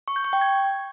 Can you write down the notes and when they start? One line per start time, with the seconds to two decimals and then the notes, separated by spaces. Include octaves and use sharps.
0.08 C#6
0.16 G6
0.24 C#6
0.33 G5
0.41 G#6